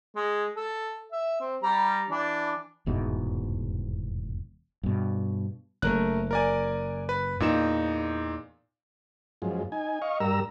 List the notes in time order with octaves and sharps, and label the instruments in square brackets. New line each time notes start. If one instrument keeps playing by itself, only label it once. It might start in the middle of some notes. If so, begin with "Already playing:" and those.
[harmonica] G#3
A4
E5
C4
G3 A#5
E3 D4
[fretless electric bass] F1 E2 G#2 B2
G2 B2
[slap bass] F#1 [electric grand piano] A3 A#4 F#6
[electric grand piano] A#4 D5 G#5
B4
[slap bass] E2 [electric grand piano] A#2 D#4 E7
[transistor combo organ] F#2 F3 G#3
D#4 G#5
D#5 F5 C#6
G2 G3 A#4 A#5 E6